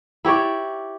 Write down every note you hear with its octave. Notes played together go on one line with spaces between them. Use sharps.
E4 G4 C#5 D5